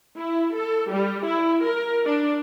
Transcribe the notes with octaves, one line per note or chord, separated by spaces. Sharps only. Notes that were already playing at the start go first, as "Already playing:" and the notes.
E4
A4
G3
E4
A#4
D4